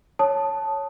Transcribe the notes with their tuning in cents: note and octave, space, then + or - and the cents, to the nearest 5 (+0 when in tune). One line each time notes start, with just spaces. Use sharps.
C#5 +0 A5 +0 D#6 +0